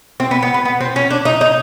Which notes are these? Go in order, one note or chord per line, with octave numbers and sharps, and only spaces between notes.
C4
B3
B3
B3
B3
C4
C#4
D4
D#4
D#4